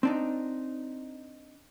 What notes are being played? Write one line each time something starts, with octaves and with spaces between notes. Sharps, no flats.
C4 D4 D#4